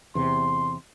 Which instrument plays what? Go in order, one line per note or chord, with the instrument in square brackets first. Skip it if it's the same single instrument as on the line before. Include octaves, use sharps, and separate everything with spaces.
[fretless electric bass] E2 C3 [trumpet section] C6